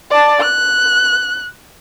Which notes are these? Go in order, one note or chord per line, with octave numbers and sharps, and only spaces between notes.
D5 A5
F#6